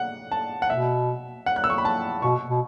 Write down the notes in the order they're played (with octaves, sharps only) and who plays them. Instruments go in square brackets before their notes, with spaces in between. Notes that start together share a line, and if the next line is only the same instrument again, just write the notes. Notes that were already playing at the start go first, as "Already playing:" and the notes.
Already playing: [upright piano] F#5
A5
F#5
[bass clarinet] B2 [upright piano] E5
[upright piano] F#5
F#6
E6
C#6
B5
A5
[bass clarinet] B2 [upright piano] C#6
[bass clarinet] B2